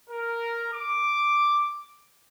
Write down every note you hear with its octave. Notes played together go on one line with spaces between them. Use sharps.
A#4
D6